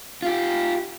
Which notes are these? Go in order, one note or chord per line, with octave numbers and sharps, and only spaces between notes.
F4 G4